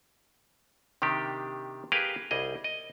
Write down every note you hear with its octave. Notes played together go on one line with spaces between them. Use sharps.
C3 D#3 D4 G4
G4 G#4 A#4 B4 F5 G5
C2 G3 G#4 D#5
D#5